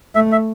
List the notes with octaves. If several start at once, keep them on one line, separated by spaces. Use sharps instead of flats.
A3 E5
E5